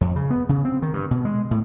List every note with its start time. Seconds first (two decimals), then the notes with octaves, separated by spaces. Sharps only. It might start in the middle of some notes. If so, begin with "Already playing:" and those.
0.01 F2
0.16 C#3
0.30 B3
0.49 C#3
0.65 C4
0.82 D#3
0.93 G2
1.11 B2
1.25 G#3
1.51 A2